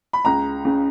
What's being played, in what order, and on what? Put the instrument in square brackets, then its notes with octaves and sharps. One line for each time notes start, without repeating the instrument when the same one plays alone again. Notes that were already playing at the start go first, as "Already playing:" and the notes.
[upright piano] B5
C#2 A#5
C#3